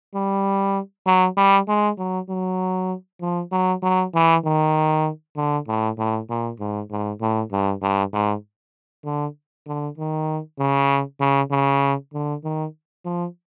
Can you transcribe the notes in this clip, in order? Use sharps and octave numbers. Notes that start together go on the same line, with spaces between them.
G3
F#3
G3
G#3
F#3
F#3
F3
F#3
F#3
E3
D#3
D3
A2
A2
A#2
G#2
G#2
A2
G2
G2
G#2
D3
D3
D#3
C#3
C#3
C#3
D3
D#3
F3